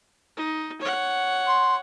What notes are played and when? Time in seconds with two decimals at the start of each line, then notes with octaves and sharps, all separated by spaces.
0.37 D#4
0.81 C#5 F#5
1.47 C6